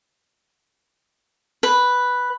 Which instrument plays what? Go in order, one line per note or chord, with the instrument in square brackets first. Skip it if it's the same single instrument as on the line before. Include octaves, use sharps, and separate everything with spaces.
[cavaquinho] B4